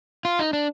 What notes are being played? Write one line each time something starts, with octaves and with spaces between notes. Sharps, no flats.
F4
D#4
D4